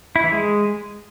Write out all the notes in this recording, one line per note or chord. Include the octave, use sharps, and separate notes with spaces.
E4
E3
G#3